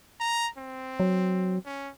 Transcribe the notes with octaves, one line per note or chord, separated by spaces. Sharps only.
A#5
C4
F#3
C#4